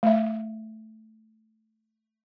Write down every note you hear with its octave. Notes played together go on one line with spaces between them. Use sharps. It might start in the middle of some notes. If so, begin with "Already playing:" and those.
A3 E5